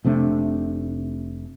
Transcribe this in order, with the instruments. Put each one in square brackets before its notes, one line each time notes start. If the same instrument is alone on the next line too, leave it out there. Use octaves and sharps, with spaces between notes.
[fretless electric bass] F1 C3 A3 D4